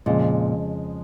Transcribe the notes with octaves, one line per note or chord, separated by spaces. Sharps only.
F2 A#2 C#3 G#3